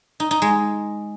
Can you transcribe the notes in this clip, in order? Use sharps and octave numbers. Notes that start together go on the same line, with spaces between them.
D#4
D#4
G#3